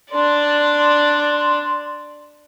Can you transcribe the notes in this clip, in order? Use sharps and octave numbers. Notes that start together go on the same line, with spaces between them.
D4 D5 C6